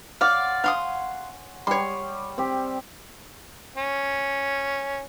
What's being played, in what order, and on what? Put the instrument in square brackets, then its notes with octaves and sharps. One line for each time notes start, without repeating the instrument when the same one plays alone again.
[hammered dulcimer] C#5 F#5 C6 [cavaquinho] D5 F5
[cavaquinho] F5 C6 D#6 [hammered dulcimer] F#5 G#5
[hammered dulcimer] G3 [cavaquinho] C#5 C6
[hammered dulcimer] C4 G4
[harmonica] C#4